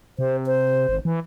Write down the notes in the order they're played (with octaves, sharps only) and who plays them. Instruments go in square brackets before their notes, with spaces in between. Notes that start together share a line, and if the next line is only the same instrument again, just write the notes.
[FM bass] C3 [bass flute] C5
[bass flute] C5
[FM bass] G#1
E3